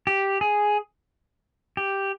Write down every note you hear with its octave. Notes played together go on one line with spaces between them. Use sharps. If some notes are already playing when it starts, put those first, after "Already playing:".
G4
G#4
G4